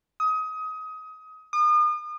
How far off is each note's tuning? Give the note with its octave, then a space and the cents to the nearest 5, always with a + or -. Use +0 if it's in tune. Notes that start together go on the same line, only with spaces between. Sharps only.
D#6 +25
D#6 -40